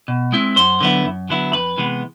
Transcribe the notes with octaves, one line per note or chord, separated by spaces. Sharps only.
B2
G#3 C4 E4
F#2 C5 C6
D3 F#3 B3 E4
F#2
D3 F#3 B3 E4
F2 B4 B5
C3 E3 G#3 B3